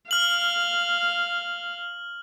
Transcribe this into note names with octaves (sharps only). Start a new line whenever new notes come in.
F5 F6 F#7